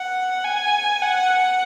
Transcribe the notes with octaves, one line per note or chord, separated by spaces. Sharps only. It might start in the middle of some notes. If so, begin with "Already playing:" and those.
Already playing: F#5
G#5
F#5